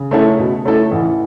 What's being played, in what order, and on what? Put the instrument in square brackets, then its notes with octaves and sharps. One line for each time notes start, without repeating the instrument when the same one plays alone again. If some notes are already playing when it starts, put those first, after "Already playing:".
Already playing: [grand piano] C#3
[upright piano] A3 C#4 E4 A4
B2
A3 C#4 E4 A4
[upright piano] A1 [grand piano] E3